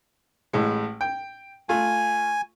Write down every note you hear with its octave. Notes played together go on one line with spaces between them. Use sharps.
A1 A2 G#3
G5
A3 F4 G#5